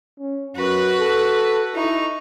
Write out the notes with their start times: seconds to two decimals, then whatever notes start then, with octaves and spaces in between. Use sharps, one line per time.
0.19 C#4
0.56 F#2 F#4 B4
0.99 A4
1.74 D#4 E4 C#6